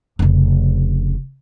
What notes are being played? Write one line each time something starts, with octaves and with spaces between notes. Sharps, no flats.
F1 C#3